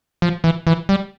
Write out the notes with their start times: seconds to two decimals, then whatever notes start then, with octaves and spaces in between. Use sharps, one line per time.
0.22 F3
0.44 E3
0.67 E3
0.89 G3